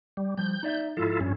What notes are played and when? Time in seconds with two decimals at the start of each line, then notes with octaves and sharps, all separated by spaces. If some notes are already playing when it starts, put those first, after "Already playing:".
0.17 G3
0.37 F3 G3 G6
0.63 D#4 D5 E5
0.97 G#2 F3 E4 F4 A4
1.21 G2 C#4